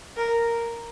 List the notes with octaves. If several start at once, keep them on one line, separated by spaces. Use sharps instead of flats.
A#4